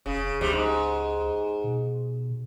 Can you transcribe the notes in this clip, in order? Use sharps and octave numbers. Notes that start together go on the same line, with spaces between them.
F1 C#3
C#2 C3 G3
G#2
B2